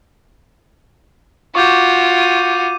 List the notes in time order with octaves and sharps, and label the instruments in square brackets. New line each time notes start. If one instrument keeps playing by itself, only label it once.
[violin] F4 F#4 [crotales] C#6 D6 G6
[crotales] D#7